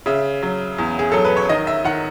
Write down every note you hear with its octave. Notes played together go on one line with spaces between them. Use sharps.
C#3 E5
F#3
E2
G#4
F#3 A4
B4
C#5
D#3 D#5
E5
D#3 F#5